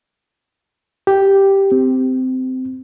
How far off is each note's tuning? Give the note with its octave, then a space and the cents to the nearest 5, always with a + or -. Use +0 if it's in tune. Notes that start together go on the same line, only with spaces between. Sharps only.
G4 +0
C4 -20